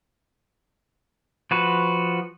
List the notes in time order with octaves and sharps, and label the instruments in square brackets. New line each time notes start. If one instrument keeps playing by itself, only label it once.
[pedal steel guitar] F3 F#4 B4